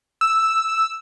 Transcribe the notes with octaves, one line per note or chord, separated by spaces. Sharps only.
E6